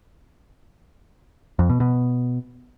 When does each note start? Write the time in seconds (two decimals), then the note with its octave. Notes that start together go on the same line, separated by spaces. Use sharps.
1.59 F2
1.70 B2
1.80 B2